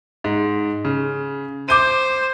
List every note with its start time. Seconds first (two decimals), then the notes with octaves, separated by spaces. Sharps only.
0.24 G#2
0.85 C#3
1.69 C5 D6 G6 D#7